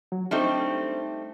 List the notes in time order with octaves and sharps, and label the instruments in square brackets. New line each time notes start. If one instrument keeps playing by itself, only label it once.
[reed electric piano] F#3
[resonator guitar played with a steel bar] G3 A3 C4 [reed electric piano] D4 D#4 C5